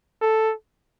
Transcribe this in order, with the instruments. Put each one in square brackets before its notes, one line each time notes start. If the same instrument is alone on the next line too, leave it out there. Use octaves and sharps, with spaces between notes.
[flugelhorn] A4